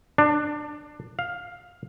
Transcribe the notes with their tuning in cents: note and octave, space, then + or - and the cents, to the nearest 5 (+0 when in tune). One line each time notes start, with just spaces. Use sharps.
D4 +20
F5 +10